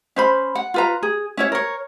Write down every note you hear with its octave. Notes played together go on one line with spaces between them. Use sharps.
C#4 C5 B5
F#5
F4 B4 A#5
G#4
C#4 E4 C#5
A#4 C#5